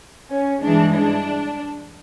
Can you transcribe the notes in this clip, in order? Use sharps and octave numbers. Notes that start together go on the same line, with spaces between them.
C#4
G2 E3 G#3 D4
D4